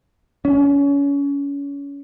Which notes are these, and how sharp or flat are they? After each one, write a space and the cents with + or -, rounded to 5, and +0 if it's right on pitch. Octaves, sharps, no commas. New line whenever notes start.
C#4 +30